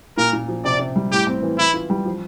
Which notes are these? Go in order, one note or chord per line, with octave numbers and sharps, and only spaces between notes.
A#2 A#4
A#2
F3
C3 D5
C3
G3
A2 G4
C4
E3
E3 E4
F4
G3
F3